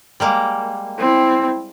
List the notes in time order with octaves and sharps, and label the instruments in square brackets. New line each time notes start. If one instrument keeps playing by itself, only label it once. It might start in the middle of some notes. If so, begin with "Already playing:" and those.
[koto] G3 G#3 A#3
[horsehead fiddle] C4 E4